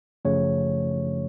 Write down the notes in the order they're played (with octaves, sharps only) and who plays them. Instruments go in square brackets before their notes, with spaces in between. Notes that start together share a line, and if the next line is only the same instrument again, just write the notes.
[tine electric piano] F#2 C#3 F3 A3 C#5